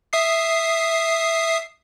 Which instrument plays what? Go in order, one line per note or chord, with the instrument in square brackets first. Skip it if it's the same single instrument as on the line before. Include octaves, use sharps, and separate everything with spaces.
[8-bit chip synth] E5 D#6 C7